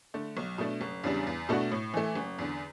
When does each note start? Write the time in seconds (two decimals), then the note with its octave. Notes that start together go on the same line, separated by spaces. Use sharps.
0.14 D3 A3
0.37 B1
0.58 B2 A3 D4
0.81 F#1
1.04 E2 C#3 G3 D4
1.27 E2
1.49 B2 A3 D4 F#4
1.72 A2
1.94 E3 A3
2.15 F#1
2.38 E2 D3